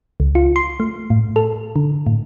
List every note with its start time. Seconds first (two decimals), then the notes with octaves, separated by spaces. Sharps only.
0.20 C#2
0.35 F4
0.56 C6
0.80 A3
1.10 A2
1.36 A4
1.76 D3
2.06 A2